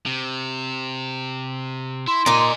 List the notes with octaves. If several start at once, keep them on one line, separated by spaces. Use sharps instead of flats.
C3
E4 C6
A#2 D#4 D5 G#5